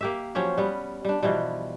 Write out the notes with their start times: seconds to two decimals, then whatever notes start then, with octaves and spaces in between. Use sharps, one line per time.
0.01 A#3 G4 E5
0.35 F3 F#3 C#4 G4
0.58 G3 B3
1.05 G3 D4
1.23 B2 E3 F3 G3